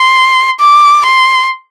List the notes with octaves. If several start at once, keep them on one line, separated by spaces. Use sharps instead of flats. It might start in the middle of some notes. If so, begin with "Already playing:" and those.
Already playing: C6
D6
C6